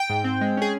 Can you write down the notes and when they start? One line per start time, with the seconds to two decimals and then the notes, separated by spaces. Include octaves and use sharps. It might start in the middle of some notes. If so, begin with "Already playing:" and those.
Already playing: G5
0.10 G#2
0.24 C4
0.41 G#3
0.57 C#4 G#4